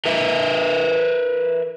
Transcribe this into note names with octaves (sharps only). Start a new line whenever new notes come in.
A#4 B4 E5